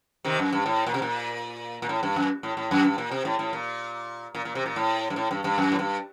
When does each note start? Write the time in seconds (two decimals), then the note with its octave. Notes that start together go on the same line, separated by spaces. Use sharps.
0.25 C3 D#3
0.39 F#2
0.52 G2
0.66 A2
0.87 A#2
0.94 C3
1.02 A#2
1.82 A#2
1.89 A2
2.03 G2
2.16 F#2
2.43 A2
2.57 A2
2.71 F#2
2.84 G2
2.98 A#2
3.11 C3
3.25 A2
3.39 A2
3.53 A#2
4.35 A#2
4.45 A#2
4.55 C3
4.66 A#2
4.76 A2
5.10 G2
5.16 A2
5.31 G2
5.44 G2
5.58 F#2
5.72 A2
5.79 G2